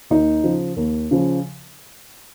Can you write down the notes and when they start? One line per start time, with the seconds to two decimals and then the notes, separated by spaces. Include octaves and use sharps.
0.10 D#2 D#4
0.44 C#3 F3
0.77 D#2
1.11 C#3 F3